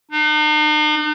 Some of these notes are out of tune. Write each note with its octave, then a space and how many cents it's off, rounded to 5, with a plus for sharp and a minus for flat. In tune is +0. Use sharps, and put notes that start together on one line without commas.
D#4 -45